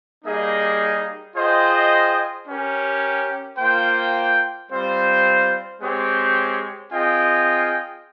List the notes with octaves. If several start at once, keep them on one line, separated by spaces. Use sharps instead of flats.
G3 A#3 D#4 G#4 D#5
F4 G#4 C5 D#5 G5
C#4 G4 A#4
A#3 F4 C5 G5
G3 C4 F4 C5
G#3 C4 G4 C#5
C4 F4 G#4 D#5 G5